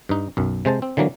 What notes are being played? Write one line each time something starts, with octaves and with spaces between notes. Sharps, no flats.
G2 D#4
B1 F#2
C3 G#3 C5 A5
C4
D3 E3 F#3 A#3